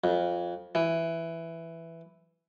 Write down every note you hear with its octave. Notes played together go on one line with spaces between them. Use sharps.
F2
E3